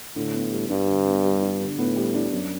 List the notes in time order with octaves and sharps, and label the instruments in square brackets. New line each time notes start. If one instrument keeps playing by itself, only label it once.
[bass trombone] A2 [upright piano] D3
[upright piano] B3
G3
[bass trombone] G2 [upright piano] D4
[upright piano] D3
B3
G3
D4
D3
[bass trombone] A2 [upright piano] B3
[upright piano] G3
D4
F#2